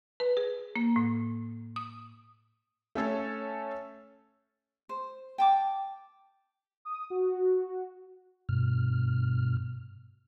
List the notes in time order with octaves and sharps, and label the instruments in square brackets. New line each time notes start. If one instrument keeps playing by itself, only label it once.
[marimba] B4
G#4
A#3
A2
D#6
[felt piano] A3 C#4 A4 C#5
[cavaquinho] C5
G5 A5 D6
[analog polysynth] D#6
F#4
[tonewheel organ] G2 B2 F6